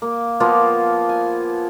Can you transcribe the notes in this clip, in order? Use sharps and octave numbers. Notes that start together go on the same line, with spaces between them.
A#3
F3 A#3 B3 F4
G#5